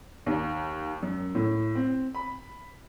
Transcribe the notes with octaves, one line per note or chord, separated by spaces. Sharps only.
D#2
F#2
A2
C4
B5